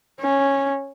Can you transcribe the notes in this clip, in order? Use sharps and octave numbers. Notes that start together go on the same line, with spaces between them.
C#4